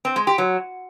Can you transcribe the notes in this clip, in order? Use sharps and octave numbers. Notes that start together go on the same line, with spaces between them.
C4
G#3
G4
F#3